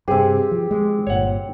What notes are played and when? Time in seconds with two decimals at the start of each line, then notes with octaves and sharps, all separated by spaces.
0.08 G2 C3 C4 G4 G#4 B4
0.51 F3
0.71 G#3
1.07 G1 A#2 C#5 F#5